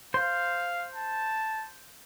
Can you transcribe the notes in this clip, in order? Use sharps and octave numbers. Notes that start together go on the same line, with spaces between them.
C5 F5
A5